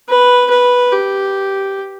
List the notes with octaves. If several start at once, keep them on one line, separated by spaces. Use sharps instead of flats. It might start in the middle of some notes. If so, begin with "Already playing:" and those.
B4
B4
G4